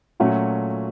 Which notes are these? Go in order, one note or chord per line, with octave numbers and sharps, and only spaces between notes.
A#2 F#3 A3 C#4 F#4